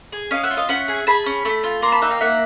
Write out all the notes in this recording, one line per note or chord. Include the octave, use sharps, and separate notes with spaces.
G#4
C#4 D#5 F5
E5 F#5
F4
D#5 F5
C#4 E5 F#5
G#4
G#4 A5 B5
C#4
A3
F4
A#3 A#5 C6
A5 B5
D#4 E5 F#5
F5 G5
A#3 E5 F#5